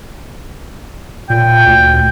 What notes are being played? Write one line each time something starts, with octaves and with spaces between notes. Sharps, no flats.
A#2 G5
D2